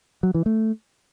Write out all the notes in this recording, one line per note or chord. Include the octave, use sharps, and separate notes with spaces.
F#3
E3
A3